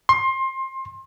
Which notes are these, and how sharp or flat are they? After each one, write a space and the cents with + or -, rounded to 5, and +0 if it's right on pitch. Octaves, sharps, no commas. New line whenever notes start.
C6 +25